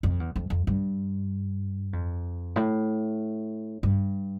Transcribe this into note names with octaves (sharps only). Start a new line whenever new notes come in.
F2
E2
F2
F2
G2
F2
A2
G2